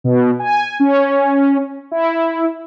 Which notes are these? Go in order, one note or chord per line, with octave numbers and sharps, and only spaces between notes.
B2
G#5
C#4
E4